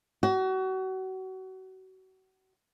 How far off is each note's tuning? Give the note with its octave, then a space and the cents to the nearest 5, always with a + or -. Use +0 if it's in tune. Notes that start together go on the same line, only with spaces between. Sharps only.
F#4 +30